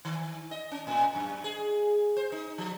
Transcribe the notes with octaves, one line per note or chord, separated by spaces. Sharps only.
D#3
D#5
C#4
A2
F#2
G#4
C5
D#4
F3